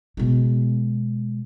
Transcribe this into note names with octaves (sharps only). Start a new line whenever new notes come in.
B2 G#3